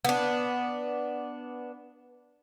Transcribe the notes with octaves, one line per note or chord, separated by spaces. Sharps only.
B3 D4